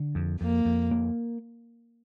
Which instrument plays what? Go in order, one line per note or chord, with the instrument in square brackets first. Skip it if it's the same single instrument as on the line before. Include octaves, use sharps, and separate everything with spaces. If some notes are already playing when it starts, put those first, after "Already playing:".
Already playing: [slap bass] D3
F2
[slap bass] F2 [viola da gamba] A#3
[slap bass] F2
A#3